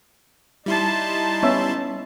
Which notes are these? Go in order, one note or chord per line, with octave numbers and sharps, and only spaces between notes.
G3 D#4 E4 A5 C6
B3 C#4 E5